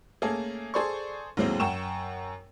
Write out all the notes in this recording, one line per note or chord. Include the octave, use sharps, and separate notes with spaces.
A3 A#3 C#4 G#4 A4
G#4 A4 C5 D5 C6 C#6
D#2 A2 F#3 G#3 A#3 C4
F#2 F#5 G5 C#6 E7